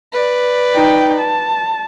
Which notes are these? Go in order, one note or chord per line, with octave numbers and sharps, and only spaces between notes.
B4 D5
D#4 G5
A5